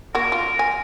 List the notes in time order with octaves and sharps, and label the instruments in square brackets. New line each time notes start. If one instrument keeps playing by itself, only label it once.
[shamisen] A#3 F#4 [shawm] A#4
[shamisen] F4
G#5